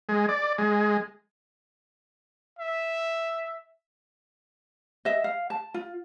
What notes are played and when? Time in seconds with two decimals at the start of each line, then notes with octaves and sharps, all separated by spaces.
0.09 G#3
0.29 D5
0.58 G#3
2.59 E5
5.05 D#5 E5
5.24 F5
5.50 A5
5.74 F4